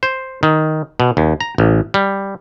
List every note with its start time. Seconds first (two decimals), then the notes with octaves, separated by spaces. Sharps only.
0.03 C5
0.43 D#3
1.00 B2
1.17 D#2
1.40 A#5
1.58 A1
1.94 G3